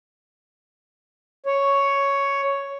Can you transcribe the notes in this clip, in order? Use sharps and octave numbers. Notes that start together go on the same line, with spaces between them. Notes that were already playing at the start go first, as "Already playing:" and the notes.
C#5